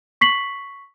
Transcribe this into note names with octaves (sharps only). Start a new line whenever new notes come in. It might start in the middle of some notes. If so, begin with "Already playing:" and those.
C#6 B6 C7 F#7